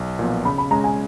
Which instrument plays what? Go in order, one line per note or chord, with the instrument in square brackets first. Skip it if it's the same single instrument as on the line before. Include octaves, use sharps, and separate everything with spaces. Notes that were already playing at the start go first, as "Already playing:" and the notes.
Already playing: [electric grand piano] B1
A#2 F3 B3
[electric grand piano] C#3 [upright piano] B5
[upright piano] B5
[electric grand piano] G#3 C#4 [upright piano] A#5
[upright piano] G#5